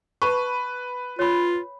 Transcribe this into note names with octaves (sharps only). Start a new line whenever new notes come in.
B4 A5 B5 C#6
F4 C#5 B5